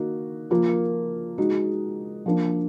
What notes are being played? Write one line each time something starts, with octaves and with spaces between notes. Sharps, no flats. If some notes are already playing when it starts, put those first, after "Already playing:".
Already playing: D#3 A#3 D#4 F#4
F3 A#3 F4 A#4
G#3 D#4 F#4
F3 A#3 D4